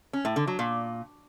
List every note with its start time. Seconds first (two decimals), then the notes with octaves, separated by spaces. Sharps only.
0.13 C#4
0.25 A2
0.36 D3
0.47 F#3
0.59 A#2